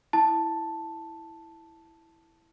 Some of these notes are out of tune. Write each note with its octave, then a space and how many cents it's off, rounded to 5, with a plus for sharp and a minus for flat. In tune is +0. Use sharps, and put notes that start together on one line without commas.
E4 +0 A5 +0